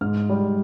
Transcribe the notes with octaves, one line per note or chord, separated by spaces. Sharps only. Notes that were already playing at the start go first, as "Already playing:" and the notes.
G#2 F6
G3